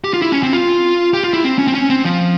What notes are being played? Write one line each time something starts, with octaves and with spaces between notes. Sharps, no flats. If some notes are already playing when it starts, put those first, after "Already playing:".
G4
F4
E4
C#4
C4
F4
G4
F4
E4
C4
C#4
C4
C#4
C4
F3